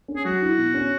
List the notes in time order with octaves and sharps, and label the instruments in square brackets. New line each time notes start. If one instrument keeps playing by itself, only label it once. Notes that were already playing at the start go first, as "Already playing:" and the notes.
[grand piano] C#4
[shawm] G#4
[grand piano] F#3 [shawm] F#4
[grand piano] E4
B2
C#4